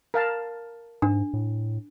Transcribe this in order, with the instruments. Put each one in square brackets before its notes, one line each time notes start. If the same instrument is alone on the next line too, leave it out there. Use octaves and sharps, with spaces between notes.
[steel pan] A#4 F5 A5
[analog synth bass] G#2 [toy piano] D4
[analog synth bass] A2